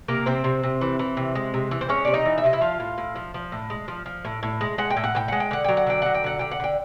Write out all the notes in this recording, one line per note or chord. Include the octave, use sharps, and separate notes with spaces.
C3 A#3 A#4
C3 C4 C5
C3
C3
E3
E3
C3
G#3
C3
E3
C5
G#3 C#4 C#5
C3 D5
D#4 D#5
E3
E5
C3 D#5
E4 E5
F3 F4 F5
A2
A2
F3
F3
A2
G#3
F3
F3
A2
A2
G#3
G#3 F#5
G5
A2
F#5
A2 G5
G#3 F#5
G5
D3 F#5
F#3 G5
F#5
D3 G5
F#3 F#5
G5
D3 F#5
D3 G5
F#5
D3 G5